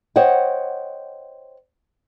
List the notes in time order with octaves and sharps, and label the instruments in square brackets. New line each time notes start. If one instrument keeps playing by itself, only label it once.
[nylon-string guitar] C5 C#5 D#5 F#5 G5